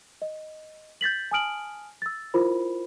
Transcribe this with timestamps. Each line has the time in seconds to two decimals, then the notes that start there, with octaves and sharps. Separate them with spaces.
0.22 D#5
1.01 G6 A6 B6 F#7
1.31 G#5 A5 D#6 F6 D7 F#7
2.02 E6 A6
2.34 E4 F4 A#4 C5 B5